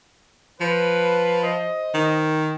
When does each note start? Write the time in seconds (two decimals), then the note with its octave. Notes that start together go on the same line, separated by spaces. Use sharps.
0.61 F3 B4
1.43 C5 D#5
1.94 D#3